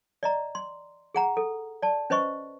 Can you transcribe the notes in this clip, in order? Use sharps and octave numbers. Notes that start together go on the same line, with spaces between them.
D5 D#5 A#5
C6
G#4 F#5 A#5
A4
D5 A5
C#4 B4 C5 D#5 C#6